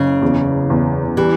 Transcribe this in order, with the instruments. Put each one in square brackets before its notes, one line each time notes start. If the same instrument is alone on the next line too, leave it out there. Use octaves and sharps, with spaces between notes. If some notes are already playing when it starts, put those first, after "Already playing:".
Already playing: [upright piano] F#1 [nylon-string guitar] C#3
[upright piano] E2
E2
[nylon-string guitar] E3 [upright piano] G3